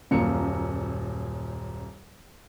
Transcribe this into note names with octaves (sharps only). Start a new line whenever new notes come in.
D#1 F#2 A#2 C#7